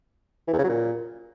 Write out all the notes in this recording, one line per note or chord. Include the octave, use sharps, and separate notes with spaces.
E3
E2
C#3
F#3
A#2